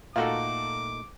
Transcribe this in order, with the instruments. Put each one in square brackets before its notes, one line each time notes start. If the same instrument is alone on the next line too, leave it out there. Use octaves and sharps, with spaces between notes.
[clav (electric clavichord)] A#2 A3 D#4 [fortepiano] F4 F#4 A4 [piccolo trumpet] D6